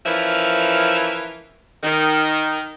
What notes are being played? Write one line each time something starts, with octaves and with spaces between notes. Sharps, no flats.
E3 F3 C#4 A#4 E5
D#3